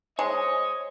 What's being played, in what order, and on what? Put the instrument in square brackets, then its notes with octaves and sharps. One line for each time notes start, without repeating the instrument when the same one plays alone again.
[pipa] G#3 [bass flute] C5 [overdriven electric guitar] C#5 [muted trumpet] D#5